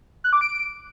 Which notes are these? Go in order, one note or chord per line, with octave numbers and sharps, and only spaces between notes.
F#6
D6
D7